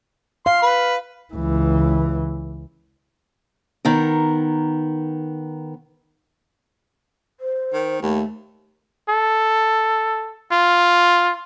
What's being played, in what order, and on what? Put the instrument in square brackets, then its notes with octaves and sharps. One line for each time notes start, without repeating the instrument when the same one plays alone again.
[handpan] F5 [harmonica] C6
[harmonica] B4
[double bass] C#2 E3
[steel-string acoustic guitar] D#3 B3 A#4
[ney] C5
[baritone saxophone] D#3
[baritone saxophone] D#2 [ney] A3
[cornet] A4
F4